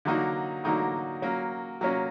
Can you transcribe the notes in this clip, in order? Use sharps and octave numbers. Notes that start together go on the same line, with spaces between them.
D3 F#3 A#3 D#4 F#4
D3 F#3 A#3 D#4 F#4
F#3 A#3 C#4
F#3 A#3 C#4